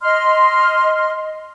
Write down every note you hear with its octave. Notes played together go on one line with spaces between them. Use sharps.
D#5 C6 F6